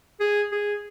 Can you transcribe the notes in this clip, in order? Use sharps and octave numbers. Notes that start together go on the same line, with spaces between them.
G#4
G#4